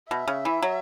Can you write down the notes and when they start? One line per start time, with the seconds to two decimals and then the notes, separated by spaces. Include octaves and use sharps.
0.11 B2 E5
0.28 C#3
0.45 E3
0.63 F#3